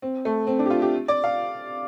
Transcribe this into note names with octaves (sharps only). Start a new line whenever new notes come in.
C4
A3
C4
D4
G4
F4
G4
D5
F5